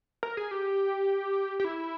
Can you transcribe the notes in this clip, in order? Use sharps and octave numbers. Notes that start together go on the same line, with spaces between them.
A#4
G#4
G4
G4
E4